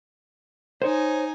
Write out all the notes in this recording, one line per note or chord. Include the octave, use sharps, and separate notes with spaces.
D#4 C5 C#5 G#5